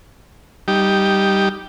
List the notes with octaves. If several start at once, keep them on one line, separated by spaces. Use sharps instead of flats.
G3 D#4 G4